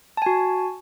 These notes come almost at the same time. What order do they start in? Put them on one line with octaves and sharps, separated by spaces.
A5 G#5 F#4